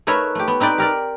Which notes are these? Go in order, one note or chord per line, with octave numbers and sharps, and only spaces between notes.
A3 D#4 A#4 B4 C#5 E5
A3 G4
B3
C4 D#4 B4 D5 G5
G4 A#4 D5